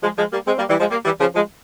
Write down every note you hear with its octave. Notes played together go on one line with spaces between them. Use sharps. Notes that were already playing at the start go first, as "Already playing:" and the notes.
F3 G#3
F3 G#3
G3 A#3
G#3 C4
G3 A#3
E3 G3
F3 G#3
G3 A#3
E3 G3
C#3 F3
F3 G#3